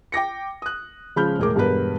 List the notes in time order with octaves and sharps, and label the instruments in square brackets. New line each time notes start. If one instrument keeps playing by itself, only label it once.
[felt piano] G5 D6 A#6 C#7
D#6 F#6
C#3 F3 G#3 B5 F6 G6
E1 A2 G#4 A#4 D6
E1 G2 B3 G#4 A#4 B4